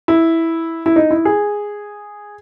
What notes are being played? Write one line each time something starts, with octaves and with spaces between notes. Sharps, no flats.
E4
E4
D#4
E4
G#4